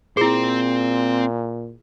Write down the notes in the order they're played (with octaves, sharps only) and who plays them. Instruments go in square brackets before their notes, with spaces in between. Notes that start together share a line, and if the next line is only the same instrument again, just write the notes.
[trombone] A#2 [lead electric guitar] C4 C5 [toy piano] E4 G#4